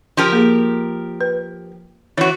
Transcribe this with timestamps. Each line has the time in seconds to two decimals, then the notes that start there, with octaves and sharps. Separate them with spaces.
0.17 F3 G4 A#4
0.33 A#3 G#4
1.21 B4
2.18 E3 F#4 C#5